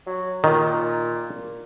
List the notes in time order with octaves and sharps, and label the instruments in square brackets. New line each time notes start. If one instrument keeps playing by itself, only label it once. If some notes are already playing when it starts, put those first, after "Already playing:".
[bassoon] F#3
[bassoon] A#2 [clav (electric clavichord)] D#3